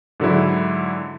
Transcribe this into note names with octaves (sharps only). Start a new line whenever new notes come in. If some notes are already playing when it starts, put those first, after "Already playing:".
G#2 D3 F#3 E4